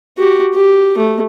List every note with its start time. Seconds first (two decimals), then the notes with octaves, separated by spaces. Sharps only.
0.18 F#4 G4
0.55 G4
0.98 A3